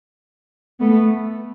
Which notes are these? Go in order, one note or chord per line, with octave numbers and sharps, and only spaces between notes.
A3 B3